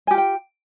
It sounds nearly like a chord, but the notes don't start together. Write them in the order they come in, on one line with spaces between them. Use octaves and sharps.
G#5 G4 F4 G5